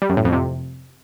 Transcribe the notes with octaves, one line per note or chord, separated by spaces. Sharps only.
G3
F#2
A2
F2
C3